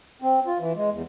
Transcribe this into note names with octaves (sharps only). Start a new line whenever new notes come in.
C4
F4
E3
G#3
E2